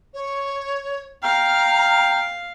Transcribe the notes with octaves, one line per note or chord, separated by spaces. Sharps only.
C#5
F5 G5 A#5 F6